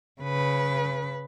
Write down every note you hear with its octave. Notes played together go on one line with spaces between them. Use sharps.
C#3 B4